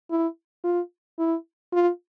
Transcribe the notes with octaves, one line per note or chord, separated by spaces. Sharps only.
E4
F4
E4
F4